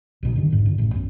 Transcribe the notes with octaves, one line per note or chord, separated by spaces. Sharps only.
B1 B2 F#3
F#2 D3 D#3
A1 E2 G#2 D3
F#2 D3
A1 A2 E3
B1 F#2